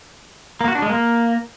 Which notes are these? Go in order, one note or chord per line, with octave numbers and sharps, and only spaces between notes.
A#3
F#4
D4
G#3
A#3